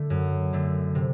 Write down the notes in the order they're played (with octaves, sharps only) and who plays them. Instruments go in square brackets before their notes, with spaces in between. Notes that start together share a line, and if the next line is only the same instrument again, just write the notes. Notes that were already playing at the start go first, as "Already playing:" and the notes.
Already playing: [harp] D3 A3
F#2
D3 A3
C3